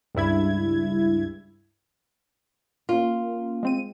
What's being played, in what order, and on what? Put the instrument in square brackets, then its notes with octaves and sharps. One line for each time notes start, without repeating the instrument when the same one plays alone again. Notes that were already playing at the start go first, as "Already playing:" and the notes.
[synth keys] C#2 G2 E4 G#6
[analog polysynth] A#3 C#4 [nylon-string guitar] F4
[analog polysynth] G#3 C4 D#7